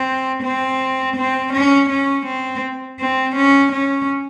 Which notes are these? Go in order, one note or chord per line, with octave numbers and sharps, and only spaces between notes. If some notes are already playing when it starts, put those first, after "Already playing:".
Already playing: C4
C4
C4
C#4
C#4
C4
C4
C#4
C#4